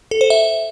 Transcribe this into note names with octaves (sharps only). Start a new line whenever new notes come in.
A4
C5
E5